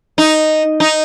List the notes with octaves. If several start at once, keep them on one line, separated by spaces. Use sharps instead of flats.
D#4
D#4